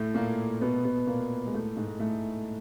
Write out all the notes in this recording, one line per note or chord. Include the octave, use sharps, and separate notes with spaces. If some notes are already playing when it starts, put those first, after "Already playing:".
Already playing: A2 A3
A#2 A#3
B2 B3
B2 B3
A#2 A#3
G#3
A2 A3
G#2 G#3
A2 A3